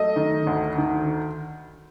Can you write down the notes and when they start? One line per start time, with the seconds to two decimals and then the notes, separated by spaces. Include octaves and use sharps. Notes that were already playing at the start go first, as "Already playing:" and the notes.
Already playing: F#3 A3 D#5
0.16 D#3
0.47 D2
0.78 D#3